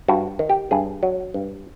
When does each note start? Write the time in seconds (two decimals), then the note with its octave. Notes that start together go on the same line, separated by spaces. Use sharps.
0.08 G2 F#4
0.39 D#3
0.49 G4
0.71 G2 G#4
1.03 F#3
1.34 G2